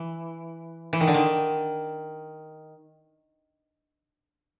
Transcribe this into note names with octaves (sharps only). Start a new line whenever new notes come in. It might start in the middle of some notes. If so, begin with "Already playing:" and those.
Already playing: E3
E3
D#3
D3
D#3